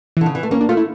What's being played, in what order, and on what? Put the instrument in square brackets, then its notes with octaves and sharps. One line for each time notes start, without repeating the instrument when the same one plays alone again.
[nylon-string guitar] D3 [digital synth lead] E3
[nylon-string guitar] C#3
E3
A3
[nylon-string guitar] A#3 [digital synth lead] C#4
[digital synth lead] D4
[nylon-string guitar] A3 [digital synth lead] F4
[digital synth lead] E4